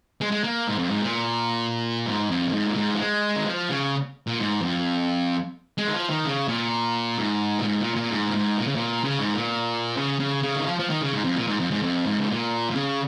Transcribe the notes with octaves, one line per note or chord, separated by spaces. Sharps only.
G#3
G#3
A#3
G#2
F2
G#2
A#2
G#2
F2
F2
G#2
A#2
G#2
F3
G#3
D#3
F3
C#3
A#2
G#2
F2
G#3
D#3
F3
D#3
C#3
A#2
G#2
A#2
G#2
A#2
A#2
G#2
A#2
G#2
A#2
C#3
A#2
C#3
G#2
A#2
C#3
C#3
C#3
D#3
F3
F3
D#3
C#3
G#2
F2
A#2
G#2
F2
G#2
F2
G#2
C#3
A#2
A#2
C#3